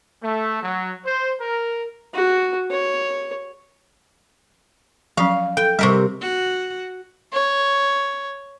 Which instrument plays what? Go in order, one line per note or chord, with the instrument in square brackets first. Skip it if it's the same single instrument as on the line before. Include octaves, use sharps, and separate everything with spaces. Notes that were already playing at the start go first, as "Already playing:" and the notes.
[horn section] A3
F#3
C5
A#4
[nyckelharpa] F#4
C#5
[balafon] F3 F#3 C#4 [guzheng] F5
[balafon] A4 [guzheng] G5
[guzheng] C3 A#4 E5 [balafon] G3 D#5 C#6
[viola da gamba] F#4
[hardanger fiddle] C#5